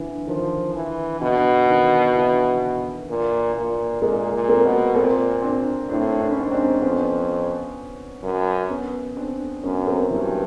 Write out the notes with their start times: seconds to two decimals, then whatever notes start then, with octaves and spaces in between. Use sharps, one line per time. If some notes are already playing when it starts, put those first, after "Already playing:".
Already playing: D3 E3
0.27 D#3 F3
0.74 E3
1.21 B2 D3
1.68 D#3
2.15 D3 E3
3.09 A#2
3.55 A#2
4.01 A#2 G#3 A#3
4.34 A#2
4.48 A#3 C4
4.64 B2
4.95 A#2 A#3 C4
5.42 C4 D4
5.89 A2 C4 D4
6.20 D4
6.31 C#4
6.36 G#2 C4 D4
6.52 C4 D4
6.82 F2 B3 C#4
8.23 F#2
8.70 B3 C#4
9.17 C4 D4
9.63 F#2 B3 C#4
9.87 A#3 C4
10.10 G2 E3 F#3